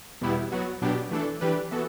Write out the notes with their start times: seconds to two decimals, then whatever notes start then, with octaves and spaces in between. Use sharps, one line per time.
0.21 E2 B2 G3 B3 E4
0.52 F#3 B3 F#4
0.82 B2 F#3 B3 D4 G4
1.11 E3 A3 D4 A4
1.41 E3 G3 D4 G4 B4
1.71 E3 B3 F#4 A4